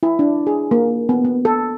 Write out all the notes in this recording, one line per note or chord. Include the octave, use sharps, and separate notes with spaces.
E4
D4
G#4
A#3
B3
B3
A4